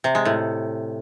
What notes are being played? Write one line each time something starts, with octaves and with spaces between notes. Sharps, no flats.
C3
G#3
A2